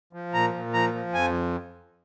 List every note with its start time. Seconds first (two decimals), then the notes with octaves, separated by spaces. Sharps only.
0.13 F3
0.34 A#2 A#5
0.54 A#2
0.73 F3 A#5
0.94 F3
1.13 F2 G#5